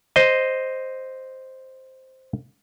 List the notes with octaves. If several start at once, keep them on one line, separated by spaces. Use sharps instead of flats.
C5 D#5